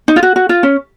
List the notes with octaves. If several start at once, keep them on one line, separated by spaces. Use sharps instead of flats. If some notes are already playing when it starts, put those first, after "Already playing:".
D#4
F4
F#4
F#4
F4
C#4